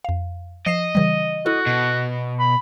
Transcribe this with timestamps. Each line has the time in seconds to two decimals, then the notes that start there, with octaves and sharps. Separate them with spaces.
0.05 F2 F5
0.67 F3 D#5 C7 E7
0.95 C#3 E3 G3
1.46 E4 F#4 A4
1.66 B2
2.40 B5